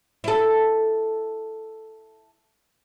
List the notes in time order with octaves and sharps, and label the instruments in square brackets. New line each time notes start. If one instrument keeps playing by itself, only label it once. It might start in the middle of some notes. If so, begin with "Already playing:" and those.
[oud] E4 A4